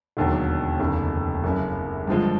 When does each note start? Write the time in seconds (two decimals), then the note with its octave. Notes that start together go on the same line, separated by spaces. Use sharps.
0.17 E1 D#2 D3 F#3
0.79 F1 D#2 C#3
1.44 F#1 F#2 C#3
2.07 G2 D3 F3 G#3